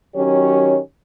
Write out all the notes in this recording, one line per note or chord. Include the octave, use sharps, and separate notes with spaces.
D#3 F#3 C#4 G4 C#5